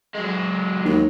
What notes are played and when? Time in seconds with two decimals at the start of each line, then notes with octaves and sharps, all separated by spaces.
0.14 F#3 G#3
0.85 D#2